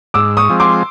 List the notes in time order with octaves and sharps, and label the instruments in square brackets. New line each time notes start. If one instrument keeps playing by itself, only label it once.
[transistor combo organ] G#2 [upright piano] D6 E6
[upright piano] C#6 D#6
[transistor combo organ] F3 G#3 C4
[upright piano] C6 D6